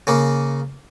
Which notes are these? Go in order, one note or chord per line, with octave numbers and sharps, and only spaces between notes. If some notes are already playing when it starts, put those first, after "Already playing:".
C#3 A#3